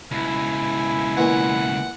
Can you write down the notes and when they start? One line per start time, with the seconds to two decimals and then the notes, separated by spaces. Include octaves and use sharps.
0.11 C#2 B2 E4 G#5
1.17 A#2 E3 F#5